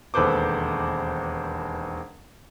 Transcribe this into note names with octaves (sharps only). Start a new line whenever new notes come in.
E1 D#2 A4 B4 C5 D6